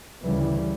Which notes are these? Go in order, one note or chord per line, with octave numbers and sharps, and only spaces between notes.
D2 C#3 E3 G3